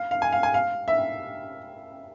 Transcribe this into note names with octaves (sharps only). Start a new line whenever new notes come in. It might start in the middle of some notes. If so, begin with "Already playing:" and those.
Already playing: F5
F5
G#5
F5
G#5
F5
E5